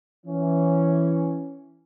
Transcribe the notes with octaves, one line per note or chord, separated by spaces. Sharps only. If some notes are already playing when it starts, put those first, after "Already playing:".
E3 C#4